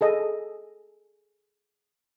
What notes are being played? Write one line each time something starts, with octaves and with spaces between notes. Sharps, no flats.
G#4 A4 D#5